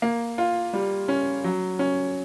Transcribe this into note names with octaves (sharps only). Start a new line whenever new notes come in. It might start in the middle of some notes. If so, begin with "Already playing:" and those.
A#3
F4
G3
C#4
F#3
C#4